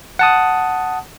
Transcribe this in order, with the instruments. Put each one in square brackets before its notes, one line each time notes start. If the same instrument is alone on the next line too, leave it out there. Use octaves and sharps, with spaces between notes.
[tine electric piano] F#5 A5 D#6